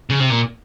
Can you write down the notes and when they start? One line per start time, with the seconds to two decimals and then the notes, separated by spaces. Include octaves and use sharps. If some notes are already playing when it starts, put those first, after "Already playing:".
0.10 C#3
0.20 C3
0.30 A#2